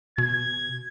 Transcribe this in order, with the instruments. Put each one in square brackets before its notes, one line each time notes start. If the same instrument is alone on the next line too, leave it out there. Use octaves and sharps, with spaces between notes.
[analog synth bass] B2 [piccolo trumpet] G#6